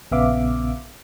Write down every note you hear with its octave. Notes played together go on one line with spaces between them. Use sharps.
A#1 C#3 B3 E5 F5 D6